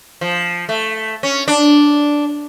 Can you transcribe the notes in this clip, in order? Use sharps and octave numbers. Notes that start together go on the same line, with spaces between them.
F3
A3
C#4
D4